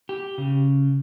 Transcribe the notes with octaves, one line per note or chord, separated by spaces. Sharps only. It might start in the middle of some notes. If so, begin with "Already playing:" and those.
G4
C#3